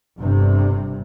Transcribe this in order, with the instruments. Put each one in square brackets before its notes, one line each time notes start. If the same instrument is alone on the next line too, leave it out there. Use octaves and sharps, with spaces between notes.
[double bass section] G1 G2 C3